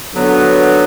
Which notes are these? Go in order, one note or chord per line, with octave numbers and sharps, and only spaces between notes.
D3 F#3 B3